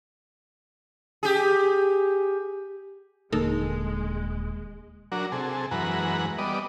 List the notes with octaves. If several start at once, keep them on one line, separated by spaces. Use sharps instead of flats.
G4 G#4
D#1 D3 G#3 A#3 D#4 A4 A#4
F#3 D4 F#4 A#4
C3 G#4 A4
F#2 E3 G#3 B4 F#5 A#5
G3 B3 D5 D#5